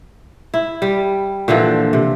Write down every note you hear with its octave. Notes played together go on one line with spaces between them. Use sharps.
E4
G3
A#2 D3 E3 F3
C3